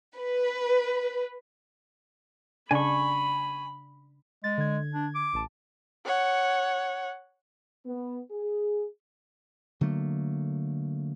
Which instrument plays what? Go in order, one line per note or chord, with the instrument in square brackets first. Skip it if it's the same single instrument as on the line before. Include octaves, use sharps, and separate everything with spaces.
[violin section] B4
[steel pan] C#3 D4 [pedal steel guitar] G#5 C#6 [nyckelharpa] B5
[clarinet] G#3 [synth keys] A6
[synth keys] D3 G#6
[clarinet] D4
D6
[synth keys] A1 A5
[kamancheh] C#5 F#5
[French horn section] B3
G#4
[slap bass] D3 F#3 A3 A#3